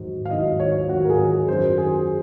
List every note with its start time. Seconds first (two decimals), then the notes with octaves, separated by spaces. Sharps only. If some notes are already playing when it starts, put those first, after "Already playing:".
Already playing: G#2 D#3 F#3
0.25 F5
0.31 G#2 D#3 F#3 D#5
0.60 C#5
0.89 G#2 D#3 F#3 F#4
1.04 A#4
1.10 G#4
1.48 F#2 D#3 F#3 C5
1.78 G#4